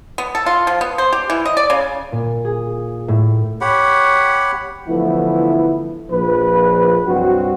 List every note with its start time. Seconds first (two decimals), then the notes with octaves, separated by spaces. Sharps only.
0.18 B3
0.35 A4
0.46 F4
0.67 F3
0.81 B3
0.98 C5
1.13 G4
1.30 E3
1.45 D#5
1.57 D5
1.70 C#3
2.12 A#2
2.45 G#4
3.08 A2
3.61 G4 C#5 F#5 B5
4.89 D3 E3 F3 A3 B3 E4
6.10 A#1 F3 B4
7.07 C2 G2 F#3 C4 F#4